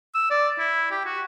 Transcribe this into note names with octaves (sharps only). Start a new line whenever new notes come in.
E6
D5
E4
G4
F#4